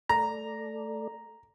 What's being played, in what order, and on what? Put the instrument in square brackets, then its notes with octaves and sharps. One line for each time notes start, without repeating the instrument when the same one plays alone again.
[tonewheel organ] A3 A4 D5 [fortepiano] A#5